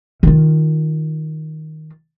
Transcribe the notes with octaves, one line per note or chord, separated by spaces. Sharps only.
D#3 F4